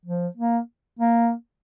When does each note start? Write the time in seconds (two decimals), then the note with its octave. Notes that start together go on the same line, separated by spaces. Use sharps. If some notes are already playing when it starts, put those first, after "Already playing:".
0.05 F3
0.37 A#3
0.99 A#3